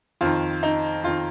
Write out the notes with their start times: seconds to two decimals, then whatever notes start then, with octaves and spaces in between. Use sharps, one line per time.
0.21 F2 D#3 F4
0.63 D#4
1.04 F2 D#3 F4